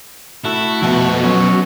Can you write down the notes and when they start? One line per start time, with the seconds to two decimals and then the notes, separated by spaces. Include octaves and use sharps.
0.45 A3 E4 F#4
0.83 F2 B2
1.24 F#3 C#4